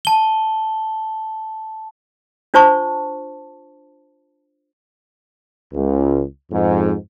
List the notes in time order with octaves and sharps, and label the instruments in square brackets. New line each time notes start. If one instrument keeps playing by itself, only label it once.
[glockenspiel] A5 G7
[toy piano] D4 F4 C5 A5 C#6
[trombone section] C#2
F2 G#2